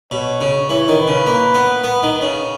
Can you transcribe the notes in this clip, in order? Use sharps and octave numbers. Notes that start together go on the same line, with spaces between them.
B2 C#5
C#3
E3 C#5
D#3
B4
C#3
A#3
B3
B3
D#3
C#3